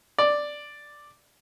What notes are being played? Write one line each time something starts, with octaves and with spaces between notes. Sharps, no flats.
D5